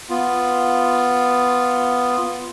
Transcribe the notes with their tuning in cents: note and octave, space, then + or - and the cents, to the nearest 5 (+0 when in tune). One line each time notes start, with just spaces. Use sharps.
B3 +0 F4 +0